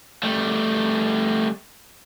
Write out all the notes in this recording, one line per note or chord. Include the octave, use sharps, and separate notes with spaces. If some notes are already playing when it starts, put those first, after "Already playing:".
G3 A3